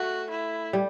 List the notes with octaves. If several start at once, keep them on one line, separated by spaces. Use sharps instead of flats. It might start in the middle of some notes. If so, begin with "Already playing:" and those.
Already playing: A3 F#4
E4
G3